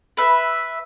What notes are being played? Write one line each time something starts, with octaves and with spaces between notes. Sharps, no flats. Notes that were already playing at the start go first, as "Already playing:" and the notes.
B4 E5